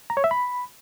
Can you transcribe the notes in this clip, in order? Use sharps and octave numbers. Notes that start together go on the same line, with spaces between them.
A#5
C#5
E5
B5